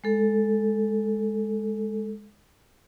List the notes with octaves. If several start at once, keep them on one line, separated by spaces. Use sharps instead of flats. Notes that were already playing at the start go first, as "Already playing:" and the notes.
G#3 A4